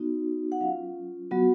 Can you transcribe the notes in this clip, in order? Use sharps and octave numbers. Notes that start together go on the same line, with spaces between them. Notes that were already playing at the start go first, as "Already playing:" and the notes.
Already playing: B3 D#4 F#4
F#5
F#3 C#4 F4 F5
F#3 B3 F#4